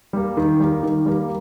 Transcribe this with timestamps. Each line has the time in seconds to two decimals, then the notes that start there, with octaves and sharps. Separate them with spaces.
0.13 G3 A#3
0.37 D#3
0.60 G3 A#3
0.83 D#3
1.06 G3 A#3